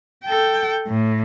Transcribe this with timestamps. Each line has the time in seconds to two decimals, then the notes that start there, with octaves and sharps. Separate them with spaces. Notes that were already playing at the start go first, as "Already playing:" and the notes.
0.25 A4 G5
0.87 A2